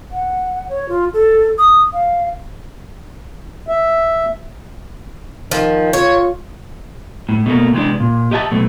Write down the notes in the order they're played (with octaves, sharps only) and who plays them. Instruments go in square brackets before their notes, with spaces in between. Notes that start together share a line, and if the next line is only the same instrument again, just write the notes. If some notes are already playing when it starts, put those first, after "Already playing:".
[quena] F#5
C#5
F4
A4
D#6
F5
[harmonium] E5
[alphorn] D#3 [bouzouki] F3
[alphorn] F4 [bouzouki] C#5
[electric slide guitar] A2
B2 A3 A#3
C3 E3 G#3 D4
A#2
G4 D#5 E5 G5 A5
B2 F#3 A3